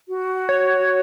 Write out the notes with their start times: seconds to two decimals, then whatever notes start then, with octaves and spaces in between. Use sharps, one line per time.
0.09 F#4
0.49 C#5